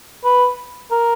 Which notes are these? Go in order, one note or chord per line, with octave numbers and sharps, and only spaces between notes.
B4
A#4